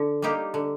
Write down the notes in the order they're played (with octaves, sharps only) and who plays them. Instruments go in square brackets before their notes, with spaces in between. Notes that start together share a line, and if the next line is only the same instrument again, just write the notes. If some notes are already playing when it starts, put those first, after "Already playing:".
Already playing: [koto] D3
G3 A#3 D#4 G4
D3